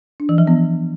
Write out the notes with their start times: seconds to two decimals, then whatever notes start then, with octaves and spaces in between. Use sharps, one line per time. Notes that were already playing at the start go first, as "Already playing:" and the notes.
0.20 D4
0.29 E3
0.38 F3
0.47 B3